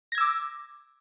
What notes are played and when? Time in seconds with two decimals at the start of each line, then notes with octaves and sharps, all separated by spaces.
0.12 A#6
0.15 G#6
0.18 E6
0.21 D6